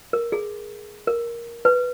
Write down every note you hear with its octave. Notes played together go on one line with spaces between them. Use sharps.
A#4
G#4
A#4
B4